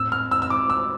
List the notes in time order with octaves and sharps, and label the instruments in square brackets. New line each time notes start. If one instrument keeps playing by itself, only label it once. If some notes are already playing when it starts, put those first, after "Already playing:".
Already playing: [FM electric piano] A2 C4 [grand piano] E6
[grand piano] F6
E6
E6
D6
E6